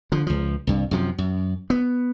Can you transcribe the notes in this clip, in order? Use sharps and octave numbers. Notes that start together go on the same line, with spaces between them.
D3 F3
C#2 F3
C2 G2
F#2 C3 F3
F#2
B3